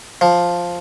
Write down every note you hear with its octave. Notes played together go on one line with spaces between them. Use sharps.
F3